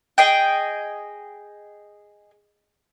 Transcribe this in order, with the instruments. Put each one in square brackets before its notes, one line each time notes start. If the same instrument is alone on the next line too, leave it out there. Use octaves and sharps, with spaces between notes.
[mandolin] G#4 D#5 G5